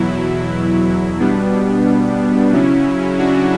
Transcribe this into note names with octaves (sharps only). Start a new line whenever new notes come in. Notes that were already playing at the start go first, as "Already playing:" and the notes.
Already playing: E2 B2 F#3 E4
B2 G3 B3 D4
C#3 F#3 C#4 E4
D4 F#4